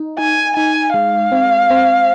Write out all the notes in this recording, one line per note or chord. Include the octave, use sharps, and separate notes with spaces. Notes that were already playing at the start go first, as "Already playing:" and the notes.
Already playing: D#4
D#4 G#5
D#4 G#5
G#3 F5
C4
C4